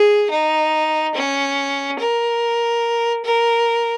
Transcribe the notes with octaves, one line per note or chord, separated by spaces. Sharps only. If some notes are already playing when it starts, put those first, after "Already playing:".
Already playing: G#4
D#4
C#4
A#4
A#4